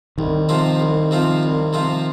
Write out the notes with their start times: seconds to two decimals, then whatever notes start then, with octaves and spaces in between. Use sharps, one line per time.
0.18 C2 D#3
0.49 C3 F3 C4 F4
0.80 C2
1.11 C3 F3 C4 F4
1.43 C2
1.73 C3 F3 C4 F4